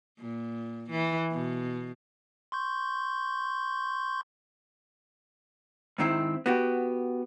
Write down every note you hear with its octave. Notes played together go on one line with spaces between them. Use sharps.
A#2
E3
B2
C6 C#6 G6
G#2 D#3 C4 E4
B3 F#4 G4